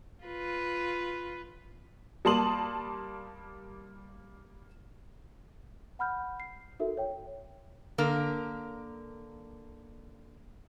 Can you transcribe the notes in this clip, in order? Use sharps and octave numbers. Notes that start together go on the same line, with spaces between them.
F4 B4
G3 A#3 A5 C6 D#6 F#7
F#5 B5 F6 G6
C7
D#4 F#4 A4 A#4 E5
C#5 G5
D3 A#3 A#4